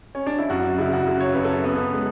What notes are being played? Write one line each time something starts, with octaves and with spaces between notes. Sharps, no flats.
C#4
D4
E4
F#2 F#4
C#3 E4
F#4
C#3
C#5
F#2 B4
A4
B3 B4
G#3